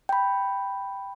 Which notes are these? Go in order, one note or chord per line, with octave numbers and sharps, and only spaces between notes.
G5 B5